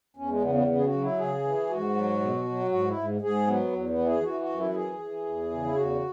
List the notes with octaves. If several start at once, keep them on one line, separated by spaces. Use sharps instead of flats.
E2 C#4
G#3
C#3 B3
B3
C#3 B3
G#4
F#4
F#3
E4
C#3 G#4
E3
G#2 F#4
F#3
B2
F#3
G#2 F#4
E4
G#2
G#2 G#4
F#3 B3
E2
B3
E3
G#4
E3 F#4
F#4
F#2
E4
E3 G#4
E3
E2
C#3
E4
E2 F#4